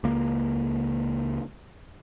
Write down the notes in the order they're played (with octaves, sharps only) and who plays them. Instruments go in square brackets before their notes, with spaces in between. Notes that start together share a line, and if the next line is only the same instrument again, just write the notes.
[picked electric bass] C#2 A#3